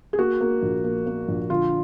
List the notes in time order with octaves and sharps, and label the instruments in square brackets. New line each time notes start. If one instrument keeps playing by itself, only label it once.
[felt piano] G#4
A#3 F#4
A#3
A#1
A#3
A#3
A#1
D3 F4